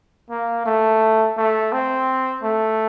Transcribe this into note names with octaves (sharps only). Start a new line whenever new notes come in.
A#3
A3
A3
C4
A3